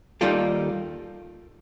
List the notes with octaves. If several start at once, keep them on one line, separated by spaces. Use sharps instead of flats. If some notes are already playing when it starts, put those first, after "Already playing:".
D#2 D#3 G3 A#3 F4 A4